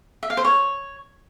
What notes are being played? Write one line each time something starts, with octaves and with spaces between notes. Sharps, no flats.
E5
F5
C5
C#5